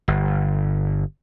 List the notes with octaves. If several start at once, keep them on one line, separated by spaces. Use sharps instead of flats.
G1